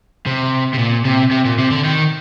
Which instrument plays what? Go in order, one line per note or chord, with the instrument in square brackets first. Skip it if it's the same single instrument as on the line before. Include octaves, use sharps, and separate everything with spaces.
[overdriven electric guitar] C3
C3
A#2
C3
C3
A#2
C3
D3
D#3